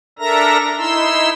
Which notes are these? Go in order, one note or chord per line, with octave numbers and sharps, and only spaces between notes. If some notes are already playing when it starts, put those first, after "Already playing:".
D4 A4 A#4 E5 A#5 A#6
D#4 E4 C6 E6